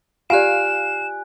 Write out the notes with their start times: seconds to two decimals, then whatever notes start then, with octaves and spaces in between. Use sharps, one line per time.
0.30 F4 G4 D5 F5 G#5 F#6 E7